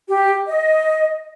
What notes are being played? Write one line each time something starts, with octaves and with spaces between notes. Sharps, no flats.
G4
D#5